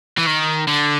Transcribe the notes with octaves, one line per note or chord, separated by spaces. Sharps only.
E3
D#3
D3